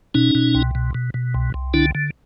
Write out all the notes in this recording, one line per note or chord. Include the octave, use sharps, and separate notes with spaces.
B2 C#4 D#4
B2
C2
B2
B2
B2
C2
C2
D3 D4 E4
D3